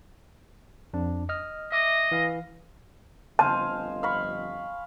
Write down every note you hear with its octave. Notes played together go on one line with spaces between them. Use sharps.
F2 D4
D#5 F6
D#5 E5 D6
E3 F5
G1 F2 C5 D#5 F5 G#5 A5
F5 B5 C#6